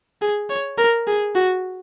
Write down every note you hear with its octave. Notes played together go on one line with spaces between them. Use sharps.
G#4
C#5
A#4
G#4
F#4